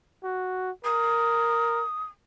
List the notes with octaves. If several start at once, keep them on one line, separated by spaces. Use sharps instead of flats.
F#4
A#4 D#6